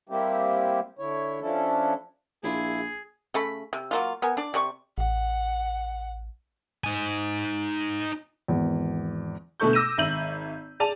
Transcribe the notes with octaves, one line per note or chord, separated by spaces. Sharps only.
G3 A#3 C4 E4 G4
D3 E4 C#5
F3 C#4 D4 E4 A4
A#1 D4 E4 F4 G#4
C#3 A3 B5
C3
F#3 A#3 F4
B3 A#4 G#5
D4 D5
C3 D5 C#6
A1 F#5
D#4 G#5
G#1 E2
D2 B2 A3 A4 C#6 G6
D6 E6 A#6 D#7 E7
G#1 E5 G6 D#7 F#7
G#4 D5 A5 D#7 F7